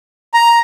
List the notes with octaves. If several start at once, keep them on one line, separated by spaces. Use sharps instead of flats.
A#5